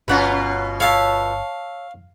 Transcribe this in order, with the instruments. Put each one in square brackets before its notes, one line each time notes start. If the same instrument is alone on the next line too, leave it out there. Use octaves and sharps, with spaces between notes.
[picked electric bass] G1 [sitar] B2 C#4 F4 [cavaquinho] B4 F#5 A#5
[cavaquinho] C#5 E5 A5 [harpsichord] F5